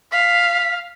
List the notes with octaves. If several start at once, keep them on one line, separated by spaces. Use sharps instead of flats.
F5 B6